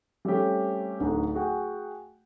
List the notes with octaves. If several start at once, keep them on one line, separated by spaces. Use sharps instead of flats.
G3 A3 C4 C#4 G4
D1 D3 D4 D#4
F#4 G#4 F#5 G5